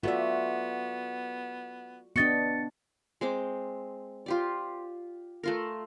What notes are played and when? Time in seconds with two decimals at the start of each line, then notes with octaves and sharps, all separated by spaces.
0.03 A3 B3 F4 F#4 D5 E5
2.16 B3 D4 F#4 D#5 G5 A6 C#7
3.21 G#3 C4 D6
4.26 F4 G4 D5
5.43 A3 F4 A#4